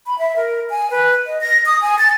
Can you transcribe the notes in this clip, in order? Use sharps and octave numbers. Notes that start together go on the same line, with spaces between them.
B5
E5
A#4
G#5
B4
D#5
A#6
D#6
G#5
A6